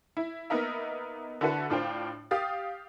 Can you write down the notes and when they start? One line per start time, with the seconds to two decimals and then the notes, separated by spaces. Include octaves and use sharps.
0.17 E4
0.50 A#3 B3 D#4 A#4 E5
1.41 D3 E4 F#4 A4 B4
1.70 A2 D4 F4 C5 G5
2.31 G4 F5 D#6 A6